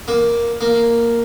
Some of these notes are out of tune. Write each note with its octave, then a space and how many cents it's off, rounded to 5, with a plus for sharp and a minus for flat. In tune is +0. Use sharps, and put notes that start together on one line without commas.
A#3 +10
A#3 +0